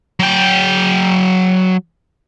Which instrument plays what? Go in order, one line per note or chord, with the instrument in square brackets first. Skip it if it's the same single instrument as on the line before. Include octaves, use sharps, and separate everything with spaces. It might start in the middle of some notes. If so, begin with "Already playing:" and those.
[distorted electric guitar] F#3 G5